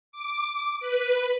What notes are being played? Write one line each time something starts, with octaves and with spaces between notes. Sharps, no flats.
D6
B4